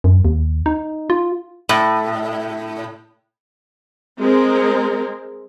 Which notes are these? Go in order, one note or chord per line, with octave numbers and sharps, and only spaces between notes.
F#2
D#2
D#4
F4
A2
G#3 C4 A#4